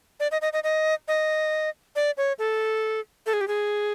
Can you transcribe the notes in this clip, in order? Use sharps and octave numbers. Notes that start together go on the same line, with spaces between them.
D5
D#5
D#5
D#5
D#5
D#5
D5
C#5
A4
A4
G#4
G4
G#4